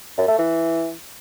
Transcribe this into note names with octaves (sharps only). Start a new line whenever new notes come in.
F#2
A3
E3